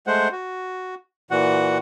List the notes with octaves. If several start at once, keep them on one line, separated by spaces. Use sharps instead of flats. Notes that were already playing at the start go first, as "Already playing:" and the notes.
G#3 A3 C5 F#5
F#4
A#2 E3 F#4 F#5